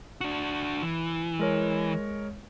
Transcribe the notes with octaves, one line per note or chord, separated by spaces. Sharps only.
D4 F#4
E3
G#3 A#4 C#5